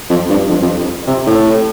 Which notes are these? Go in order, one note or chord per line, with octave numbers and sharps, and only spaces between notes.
F2
G2
F2
F2
C3
A2